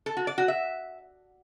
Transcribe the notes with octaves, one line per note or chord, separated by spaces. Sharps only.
A4
F#4
D5
F#4
E5